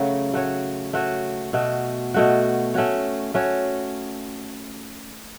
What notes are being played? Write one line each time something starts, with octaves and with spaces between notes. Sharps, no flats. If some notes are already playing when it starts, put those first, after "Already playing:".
Already playing: C#3 F#3 A3 F#4
A3 F#4 C#5
A3 F#4 C#5
B2 A3 F#4
B2 A3 F#4
A3 C#4 F#4 C#5
A3 C#4 F#4 C#5